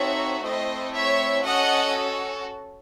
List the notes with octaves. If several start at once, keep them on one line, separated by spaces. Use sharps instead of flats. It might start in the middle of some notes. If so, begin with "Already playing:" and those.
Already playing: C4 D#4 F#4 A4 C#5 E5
A3 C4 E4 A4 C5 D#5
C#5 E5
C#4 F#4 A4 D#5 F#5